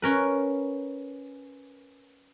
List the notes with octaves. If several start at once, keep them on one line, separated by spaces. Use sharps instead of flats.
C#4 A#4 B4